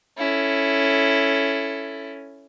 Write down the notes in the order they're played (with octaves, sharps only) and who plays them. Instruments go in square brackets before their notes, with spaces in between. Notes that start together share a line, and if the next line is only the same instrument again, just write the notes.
[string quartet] C#4 E4 A4